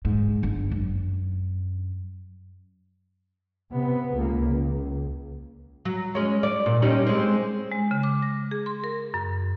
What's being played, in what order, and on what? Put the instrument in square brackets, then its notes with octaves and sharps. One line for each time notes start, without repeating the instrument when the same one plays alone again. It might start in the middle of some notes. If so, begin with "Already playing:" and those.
[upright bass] G#2
G1 D4
F#2
[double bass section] C3 B3
C#2 A#3
C#2
[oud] F#3
G#3 C#4
D5
A#2
G3 C#4 D#4
G#3 C4
[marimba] G#3
C#3
D6
A#6
G#4
C6
A#4
F#2